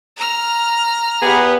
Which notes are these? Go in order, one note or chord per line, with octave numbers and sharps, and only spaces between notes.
A#5 F6
E2 B3 G4 G#4 B4